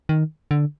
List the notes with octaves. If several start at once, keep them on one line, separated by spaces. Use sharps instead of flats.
D#3
D3